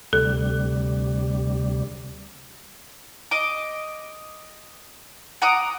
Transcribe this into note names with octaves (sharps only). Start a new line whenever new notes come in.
D2 C3 G3 A4
D#5 D6
F#5 A#5 D6 D#6